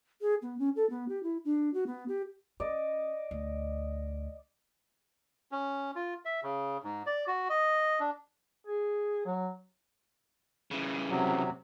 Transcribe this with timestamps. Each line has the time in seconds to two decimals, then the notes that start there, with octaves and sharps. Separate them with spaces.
0.21 G#4
0.42 B3
0.59 C#4
0.76 A4
0.90 B3
1.09 G4
1.23 E4
1.45 D4
1.74 F#4
1.87 B3
2.08 G4
2.60 C#4 D5 D#5
3.31 D2
5.52 C#4
5.95 F4
6.25 E5
6.43 C#3
6.83 G#2
7.06 D5
7.27 F#4
7.50 D#5
8.00 D4
8.67 G#4
9.26 F#3
10.71 C#3 E3
11.10 C3 F#3